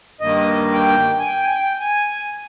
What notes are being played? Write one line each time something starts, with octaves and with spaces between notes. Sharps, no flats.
G2 D#3 A#3 D#5
G5
G#5
G5
G#5
G5
G#5